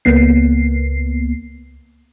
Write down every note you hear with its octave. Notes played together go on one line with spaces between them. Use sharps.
C#2 A#3 B3 C7